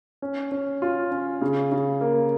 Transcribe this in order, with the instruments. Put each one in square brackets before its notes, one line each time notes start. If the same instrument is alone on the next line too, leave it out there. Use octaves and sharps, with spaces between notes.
[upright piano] C#4
C#4
F4
C#4
C#3
C#3
A#3